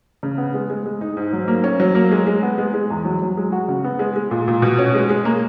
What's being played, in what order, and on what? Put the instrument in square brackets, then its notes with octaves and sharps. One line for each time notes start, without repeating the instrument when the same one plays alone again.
[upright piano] C#3
B3
G#3
G#3
G#3
D#4
G#2
F#3
A#3
C#4
F#3
A#3
G#3
G#3
B3
G#3
G#3
E2
F#3
F#3
G#3
F#4
C#3
B3
G#3
G#3
A#2
A#2
B2
C#4
G#3
G#3
A#3